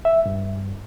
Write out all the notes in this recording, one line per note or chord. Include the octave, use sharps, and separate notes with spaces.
E5
G2